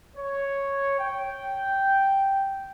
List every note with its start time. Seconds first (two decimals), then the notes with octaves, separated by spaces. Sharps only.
0.17 C#5
0.98 G5